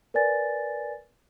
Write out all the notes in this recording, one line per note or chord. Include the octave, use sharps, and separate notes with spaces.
A#4 B4 D5 G#5 A6